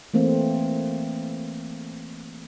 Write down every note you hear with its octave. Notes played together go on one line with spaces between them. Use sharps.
E3 A3 A#3 C4